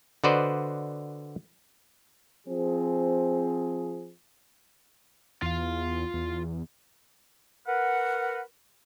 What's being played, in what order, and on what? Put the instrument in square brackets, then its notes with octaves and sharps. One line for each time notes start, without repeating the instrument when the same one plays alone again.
[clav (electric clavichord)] D3 F#4 B4 C5 D5 D#5
[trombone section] F3 C4 G#4
[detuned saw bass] E2 [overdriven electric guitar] F4 F5
[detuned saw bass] E2
[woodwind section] A#4 B4 F#5